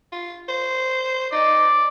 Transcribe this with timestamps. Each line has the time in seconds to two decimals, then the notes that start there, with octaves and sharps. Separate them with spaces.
0.12 F4
0.48 C5
1.32 D#4 D5